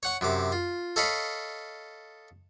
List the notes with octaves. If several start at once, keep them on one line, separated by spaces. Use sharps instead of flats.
C#5 F#5 C#6
F#2 C3 D6
F4
A4 C#5 D#5 F5 B5